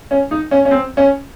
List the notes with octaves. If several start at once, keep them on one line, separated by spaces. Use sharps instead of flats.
C#4
D#4
C#4
C#4
C4
C#4